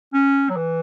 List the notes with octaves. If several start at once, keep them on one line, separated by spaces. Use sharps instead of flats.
C#4
F#3
E3